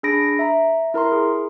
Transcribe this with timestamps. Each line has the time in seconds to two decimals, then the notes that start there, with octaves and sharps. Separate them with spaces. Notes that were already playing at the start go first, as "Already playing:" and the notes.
0.03 D4 G#4 B5 A#6 D7
0.39 E5 A#5
0.94 E4 A#4 A#5 C6
1.12 G#4